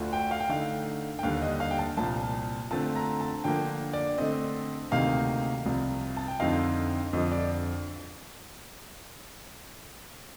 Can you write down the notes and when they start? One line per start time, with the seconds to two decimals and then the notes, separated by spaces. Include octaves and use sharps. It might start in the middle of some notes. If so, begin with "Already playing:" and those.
Already playing: D2 D3 A3 D4 F4
0.13 G5
0.31 F5
0.40 G5
0.49 D3 A3 D#4 F5
1.19 G5
1.23 D#2 D3 G3 F5
1.42 D#5
1.60 F5
1.71 G5
1.78 A5
1.97 C2 A#2 F3 A5
2.71 D3 A3 C4 F4 A5
2.95 A#5
3.20 A5
3.44 D3 F3 A#3 G5
3.93 D5
4.18 D3 A3 C4 D#5
4.91 D2 C3 D#3 A#3 D#4 F5
5.66 C2 C3 F3
6.16 A5
6.28 G5
6.40 F2 D3 F3 C4 D#4 F5
7.13 F2 D3 F3 D#5
7.32 D5